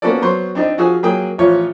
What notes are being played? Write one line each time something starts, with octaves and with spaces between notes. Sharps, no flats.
A#3 B3 C#4 F#4 A4 D5
F#3 B3 C5 C6 C#6
C4 D4 D#4
F3 F4 F#4 G#4 G#5 E6
F#3 A#3 G#4 G5 D#6
A1 F3 F4 C#5